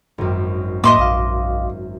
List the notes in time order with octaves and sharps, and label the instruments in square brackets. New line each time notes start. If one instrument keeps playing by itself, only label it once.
[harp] G#1 F#2
[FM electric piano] A2 A#3 [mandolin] D#5 C6 D6 [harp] E5
[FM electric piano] A#1 F5